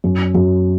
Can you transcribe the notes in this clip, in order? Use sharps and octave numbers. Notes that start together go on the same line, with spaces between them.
F#2
F#2